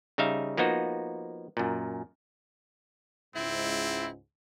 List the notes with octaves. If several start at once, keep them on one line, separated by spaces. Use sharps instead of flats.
C#3 G3 D#4 E5 F5
F3 A#3 B3 D#4 F#4
F#2 A#2
C#2 G#2 C4 E4